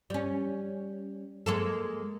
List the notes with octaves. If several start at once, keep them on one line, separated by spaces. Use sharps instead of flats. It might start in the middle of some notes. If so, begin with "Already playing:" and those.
G3 C#4
G#3 A#3 A4